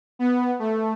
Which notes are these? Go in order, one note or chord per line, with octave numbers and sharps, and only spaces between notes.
B3
A3